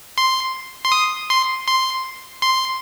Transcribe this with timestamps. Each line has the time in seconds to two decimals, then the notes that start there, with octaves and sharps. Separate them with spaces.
0.18 C6
0.85 C6
0.92 D#6
1.30 C6
1.68 C6
2.42 C6